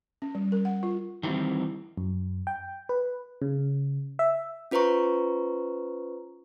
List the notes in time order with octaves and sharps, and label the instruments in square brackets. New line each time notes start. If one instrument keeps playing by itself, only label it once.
[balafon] C#4
G3
A#4
F#5
F4
[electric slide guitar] D#3 E3 F#3 G3 C4
[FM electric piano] F#2
G5
B4
C#3
E5
[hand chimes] C#4 F4 B4 C5 A#5 C#6